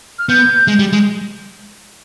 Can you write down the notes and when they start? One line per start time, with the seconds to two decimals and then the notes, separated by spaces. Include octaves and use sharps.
0.19 F6
0.29 B3 G6
0.68 G#3
0.79 G3
0.93 G#3